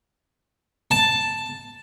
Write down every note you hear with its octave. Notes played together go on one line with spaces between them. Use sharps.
A5